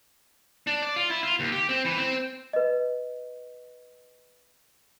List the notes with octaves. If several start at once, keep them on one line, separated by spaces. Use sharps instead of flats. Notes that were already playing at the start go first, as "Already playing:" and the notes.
D4
D5
F4
E4
F4
D#2
G4
C4
E3
C4
B4 D#5